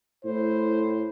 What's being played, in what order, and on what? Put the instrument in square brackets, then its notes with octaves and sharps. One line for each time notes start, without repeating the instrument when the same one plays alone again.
[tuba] A2 [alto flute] E4 [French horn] C5